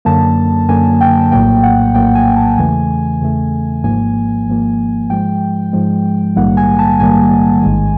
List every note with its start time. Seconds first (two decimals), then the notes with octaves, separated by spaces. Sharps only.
0.05 F#2 D3 F#3 A#3 A5
0.69 F#2 D3 F#3 A#3 G#5
1.01 G5
1.32 A#1 A2 F#3 A#3 G5
1.63 F#5
1.94 A#1 A2 F#3 A#3 G5
2.15 G#5
2.36 A5
2.58 E2 C#3 E3 A3 G#5
3.22 E2 C#3 E3 A3
3.84 G#1 G#2 F3 A#3 G#5
4.47 G#1 G#2 F3 A#3
5.10 G#2 F3 G#3 G5
5.73 G#2 F3 G#3
6.36 A#1 G#2 D#3 G3 A#3 F#5
6.57 G#5
6.79 A5
6.99 A#1 G#2 D#3 G3 A#3 G#5
7.62 A1 G#2 D#3 G#3